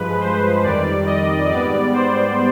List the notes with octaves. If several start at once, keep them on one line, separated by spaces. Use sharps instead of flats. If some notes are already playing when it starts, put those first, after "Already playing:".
Already playing: G2 F3 G#3 B4
C5
F2 D#3 G3 D5
D#5
G#2 G3 B3 D5
C5